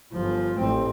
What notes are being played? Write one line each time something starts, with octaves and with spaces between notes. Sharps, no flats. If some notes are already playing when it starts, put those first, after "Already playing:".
G1 F3
A1 C4